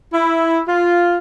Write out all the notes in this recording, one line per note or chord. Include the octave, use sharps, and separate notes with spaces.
E4
F4